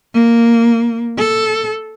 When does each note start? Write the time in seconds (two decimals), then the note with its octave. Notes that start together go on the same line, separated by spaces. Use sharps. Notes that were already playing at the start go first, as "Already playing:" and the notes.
0.14 A#3
1.18 A4